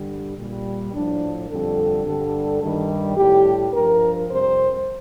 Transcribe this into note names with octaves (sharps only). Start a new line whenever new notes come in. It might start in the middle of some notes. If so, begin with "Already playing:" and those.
Already playing: G2 D3 G3
A#2 G3
A2 F3 D4
F2 D3 G3 A4
G2 D3 G3
G2 D#3 G3
A2 G3 G4
G2 F3 A#4
F2 C3 G3 C5